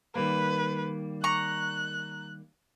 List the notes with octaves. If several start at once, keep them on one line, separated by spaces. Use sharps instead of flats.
D#3 G3 A#3 B4
A#5 C#6 F#6